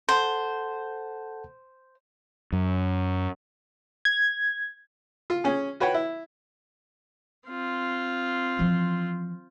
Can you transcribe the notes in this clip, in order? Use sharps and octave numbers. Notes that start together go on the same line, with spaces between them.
A4 C5 F#5 A5
F#2
G#6
F4
C#4 G#4
F#4 B4 C#5 F#5 G5
E4
C4 F4
E3 F3